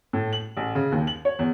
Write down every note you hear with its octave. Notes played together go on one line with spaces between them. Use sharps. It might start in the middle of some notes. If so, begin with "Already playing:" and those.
A2
F#7
A1
C#3
D#2
F#7
C#5
E2